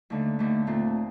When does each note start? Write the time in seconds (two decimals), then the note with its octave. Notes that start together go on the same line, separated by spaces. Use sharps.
0.10 D#2 D3 A3
0.39 D#2 D3 A3
0.67 A#2 A3 C4